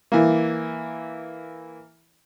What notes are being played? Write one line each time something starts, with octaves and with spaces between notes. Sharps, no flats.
E3 A#3